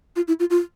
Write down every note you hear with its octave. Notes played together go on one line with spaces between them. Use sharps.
F4
E4
F4
F4